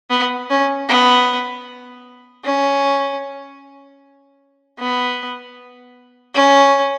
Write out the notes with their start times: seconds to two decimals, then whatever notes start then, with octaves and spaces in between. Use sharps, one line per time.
0.10 B3
0.50 C#4
0.89 B3
2.44 C#4
4.79 B3
6.34 C#4